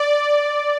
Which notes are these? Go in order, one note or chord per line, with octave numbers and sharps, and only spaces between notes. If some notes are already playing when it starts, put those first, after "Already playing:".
Already playing: D5